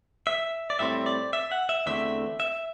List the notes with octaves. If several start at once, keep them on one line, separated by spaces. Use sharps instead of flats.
E5
D5
A2 G3 C4 E5
D5
E5
F#5
E5
E2 D3 A3 C4 E5
E5